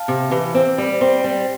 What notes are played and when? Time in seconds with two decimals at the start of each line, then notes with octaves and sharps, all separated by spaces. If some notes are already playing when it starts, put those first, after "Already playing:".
Already playing: F5 A5
0.08 C3
0.31 E3
0.54 C4
0.78 G3
1.01 C4
1.24 G3